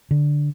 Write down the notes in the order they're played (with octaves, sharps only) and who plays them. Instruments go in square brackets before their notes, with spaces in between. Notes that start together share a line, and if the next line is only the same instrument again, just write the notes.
[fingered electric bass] D3